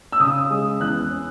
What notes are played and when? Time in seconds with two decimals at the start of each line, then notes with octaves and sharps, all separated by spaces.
0.12 E6
0.19 C#3 D#6
0.50 G#3
0.80 E2 F#6
1.10 C#4